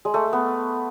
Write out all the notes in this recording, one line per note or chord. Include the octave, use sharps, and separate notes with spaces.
G#3
A3
B3